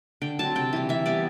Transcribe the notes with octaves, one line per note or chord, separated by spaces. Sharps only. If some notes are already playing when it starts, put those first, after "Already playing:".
D3 G5
F#3 C4 A5
C3 G5
E3 G3
E3 E5
G3 B3 D5